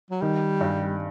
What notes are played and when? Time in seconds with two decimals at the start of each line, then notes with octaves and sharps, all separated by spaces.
0.11 F#3
0.22 D#3 G3
0.61 G2